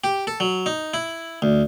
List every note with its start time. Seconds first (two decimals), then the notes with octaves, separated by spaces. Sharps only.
0.04 G4
0.27 A4
0.40 F#3
0.66 D#4
0.94 E4
1.42 D2